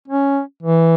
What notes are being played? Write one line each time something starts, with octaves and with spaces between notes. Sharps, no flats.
C#4
E3